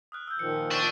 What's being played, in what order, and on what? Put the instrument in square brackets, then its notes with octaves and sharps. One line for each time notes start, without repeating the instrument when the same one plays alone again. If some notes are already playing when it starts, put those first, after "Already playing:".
[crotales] D#6 F6 F#6
E6 G6
[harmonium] A#2 D#3 F3 [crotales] C#7
[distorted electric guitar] D5 A5 [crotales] C#6 B6 D#7